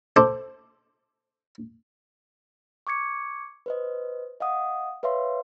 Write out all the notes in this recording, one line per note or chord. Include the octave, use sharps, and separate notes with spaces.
A4 C5 D#5 D6
C#6 D6 G#6 C#7
B4 C5 D#5
D#5 F5 F#5 D#6
B4 C#5 E5 F5 C6